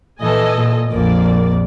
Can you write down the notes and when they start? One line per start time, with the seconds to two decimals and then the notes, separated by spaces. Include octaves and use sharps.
0.20 A#2 E3 A4 D#5 G#5
0.56 A#2
0.91 A#1 F2 A#3 D5